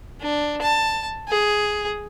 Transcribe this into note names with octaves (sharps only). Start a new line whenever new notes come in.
D4
A5
G#4